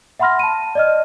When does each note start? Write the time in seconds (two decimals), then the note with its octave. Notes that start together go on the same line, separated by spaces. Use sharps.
0.19 E5 F#5 B5 C6 F6 A#6
0.39 A5 D#7
0.75 D5 D#5 F6